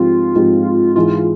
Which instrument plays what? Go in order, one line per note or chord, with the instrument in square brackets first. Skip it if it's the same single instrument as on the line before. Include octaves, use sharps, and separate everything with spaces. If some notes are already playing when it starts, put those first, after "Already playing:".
Already playing: [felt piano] G#2 F3 C4 G4 [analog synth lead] F4
[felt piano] G#2 F3 C4 G4
[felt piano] G#2 E3 G#3 E4 [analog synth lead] F4